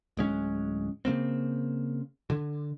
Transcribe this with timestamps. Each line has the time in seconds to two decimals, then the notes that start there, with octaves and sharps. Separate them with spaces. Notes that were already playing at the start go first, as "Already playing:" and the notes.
0.17 D1 G#3 C#4
1.05 C#3 F#3 A#3 C4
2.30 D3